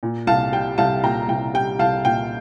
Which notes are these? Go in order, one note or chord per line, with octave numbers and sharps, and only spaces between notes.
A#2
C2 F5 A5
G3 G5
C2 F5 A5
A#2 G5 A#5
C2 G5
G3 G5
C2 F5 A5
A#2 G5